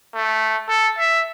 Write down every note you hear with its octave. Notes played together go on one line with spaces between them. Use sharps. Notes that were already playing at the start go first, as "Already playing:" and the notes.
A3
A4
E5